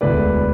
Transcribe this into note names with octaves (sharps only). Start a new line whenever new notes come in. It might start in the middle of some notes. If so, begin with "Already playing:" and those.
E1 D2 D3 A3 E4 B4 D5